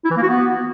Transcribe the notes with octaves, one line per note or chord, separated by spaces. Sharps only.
E4
E3
A#3
F#4
B3